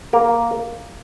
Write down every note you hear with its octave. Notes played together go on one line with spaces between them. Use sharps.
A#3 A#4